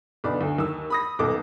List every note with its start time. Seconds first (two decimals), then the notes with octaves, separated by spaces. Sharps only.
0.24 B1 D3 B3 D5 B5
0.41 D2
0.58 D#2 E6
0.90 B5 D#6 A#6
1.19 D#1 B1 A4 D6